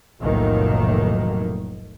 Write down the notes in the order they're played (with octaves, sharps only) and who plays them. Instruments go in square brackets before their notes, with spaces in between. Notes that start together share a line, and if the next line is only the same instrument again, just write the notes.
[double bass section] F1 B1 A2 D#3 F#3 A#3